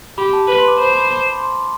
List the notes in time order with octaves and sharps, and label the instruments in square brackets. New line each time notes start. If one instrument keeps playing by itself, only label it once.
[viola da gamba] G4 [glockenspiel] B5
[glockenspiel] A5
[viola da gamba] B4 [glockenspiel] B5
[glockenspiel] C6
D6
[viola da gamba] C5 [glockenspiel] B5
[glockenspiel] B5
B5
B5
C6